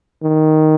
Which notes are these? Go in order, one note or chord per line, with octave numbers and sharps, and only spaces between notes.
D#3